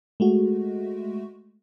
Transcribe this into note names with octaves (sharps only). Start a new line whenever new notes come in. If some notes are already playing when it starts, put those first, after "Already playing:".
G#3 A3 F#4